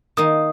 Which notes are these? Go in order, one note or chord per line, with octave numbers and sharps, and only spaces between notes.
D#3 A#3 D#4 D#6